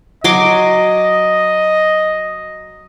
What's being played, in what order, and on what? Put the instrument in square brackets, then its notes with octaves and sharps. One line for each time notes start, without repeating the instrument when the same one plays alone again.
[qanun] F#3 C6 D6 [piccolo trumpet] D#5